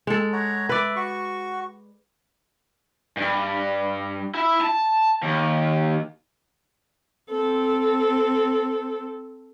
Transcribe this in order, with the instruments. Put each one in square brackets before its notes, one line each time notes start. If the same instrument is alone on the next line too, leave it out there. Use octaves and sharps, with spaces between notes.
[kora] G#3 A4
[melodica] C#5 F#5 A#5
[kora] B4 D5 [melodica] E5
[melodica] F#4 C#6
[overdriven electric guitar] G2
E4
A5
D#2
[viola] C4 A4